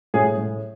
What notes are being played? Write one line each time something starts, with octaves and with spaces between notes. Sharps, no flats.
A2 G#4
A2